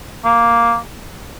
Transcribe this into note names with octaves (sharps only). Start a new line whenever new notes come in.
A#3